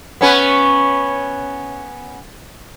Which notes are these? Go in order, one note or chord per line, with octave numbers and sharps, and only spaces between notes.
B3 C#4 B4